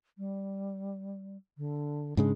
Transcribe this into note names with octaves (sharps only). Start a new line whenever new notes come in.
G3
D3
G#2 C#3 G#3 D4